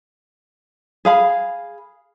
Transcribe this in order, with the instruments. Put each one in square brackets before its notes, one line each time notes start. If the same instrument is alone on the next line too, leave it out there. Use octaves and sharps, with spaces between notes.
[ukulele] G#4 F5 B5